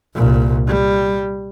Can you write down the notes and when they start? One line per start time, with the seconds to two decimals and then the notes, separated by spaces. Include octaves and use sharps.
0.15 C2 A#2
0.67 G3